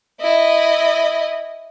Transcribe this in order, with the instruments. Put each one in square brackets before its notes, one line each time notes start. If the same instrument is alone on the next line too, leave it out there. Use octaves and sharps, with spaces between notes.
[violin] E4 D#5